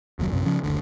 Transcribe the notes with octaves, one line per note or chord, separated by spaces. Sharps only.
F1 D#2 B2 F#3
A#1 F#2 C3
C#3 F3 C#4
F#1 D2 D3